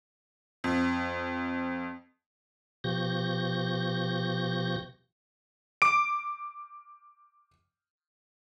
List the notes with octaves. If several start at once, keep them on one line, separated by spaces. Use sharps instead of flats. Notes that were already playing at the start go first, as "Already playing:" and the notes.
F2
B2 F3 G4 C#6 G6 A#6
D6 D7